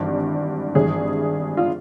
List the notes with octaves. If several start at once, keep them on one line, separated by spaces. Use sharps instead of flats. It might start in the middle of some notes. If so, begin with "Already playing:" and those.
Already playing: G#1 G2 E3
G#1 G2 E3 G#4
F4